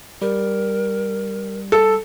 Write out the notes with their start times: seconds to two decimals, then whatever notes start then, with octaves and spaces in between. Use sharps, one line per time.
0.22 G3 A#4
1.72 A4